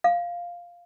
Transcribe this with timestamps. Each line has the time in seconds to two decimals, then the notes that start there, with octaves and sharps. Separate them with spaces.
0.04 F5